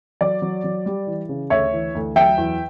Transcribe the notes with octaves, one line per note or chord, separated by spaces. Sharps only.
F#3 D5
F#3
F#3
G3
E3
C#3
D2 C#5 E5
E3
D2
F#3 E5 G5
E2